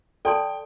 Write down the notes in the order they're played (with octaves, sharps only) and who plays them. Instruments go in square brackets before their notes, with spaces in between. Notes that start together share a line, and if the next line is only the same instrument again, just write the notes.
[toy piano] A4 D5 A5 C6 [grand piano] G5